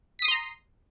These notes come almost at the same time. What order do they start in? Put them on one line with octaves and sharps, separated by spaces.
B6 D#6 C7 C6 A#5